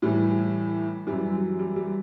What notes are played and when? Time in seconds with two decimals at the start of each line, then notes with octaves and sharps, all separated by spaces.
0.02 A2 E3 G3
1.07 F#2 E3 G3
1.34 F#3
1.59 G3
1.76 G3